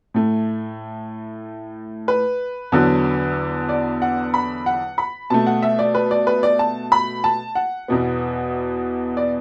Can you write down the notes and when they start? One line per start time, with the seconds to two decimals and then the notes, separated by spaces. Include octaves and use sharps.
0.14 A2 A3
2.08 B4
2.72 E2 D3 F#3
3.69 D5
4.02 F#5
4.34 B5
4.66 F#5
4.98 B5
5.30 B2 A3 A5
5.47 F#5
5.62 E5
5.79 D5
5.95 B4
6.11 D5
6.27 B4
6.43 D5
6.59 A5
6.92 B5
7.24 A5
7.55 F#5
7.88 E2 B2 B3
9.17 D5